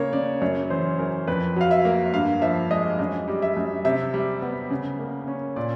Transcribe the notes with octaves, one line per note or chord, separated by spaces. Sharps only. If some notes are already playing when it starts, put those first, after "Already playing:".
Already playing: C#3 A#3 C#5
C#3 D5
F#2 C#5
E3 C5
F#2 A#4
F2 B4
F#3 F5
E5
A#3
G2 F5
F3 E5
G#3 D#5
F#2 D#5
G3
E5
F#2
C3 E5
G3
B3
C#3
A#3
C#4
A#2 D5